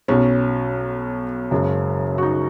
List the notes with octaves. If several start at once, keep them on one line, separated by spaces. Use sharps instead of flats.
B1 B2 F#3 C#4
F#1 F#2 C#3 G#3
F#4
D#4